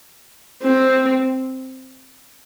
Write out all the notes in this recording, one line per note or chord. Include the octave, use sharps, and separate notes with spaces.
C4